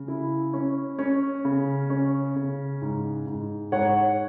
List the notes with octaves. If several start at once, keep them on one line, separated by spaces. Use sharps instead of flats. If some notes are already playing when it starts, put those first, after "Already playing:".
Already playing: C#3
E4
C#4
C#4
C#3
C#4
C#3
G#2
G#2
G#2 C#5 F#5